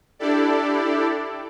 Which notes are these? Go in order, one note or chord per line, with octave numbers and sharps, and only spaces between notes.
D4 E4 G4 A4 D5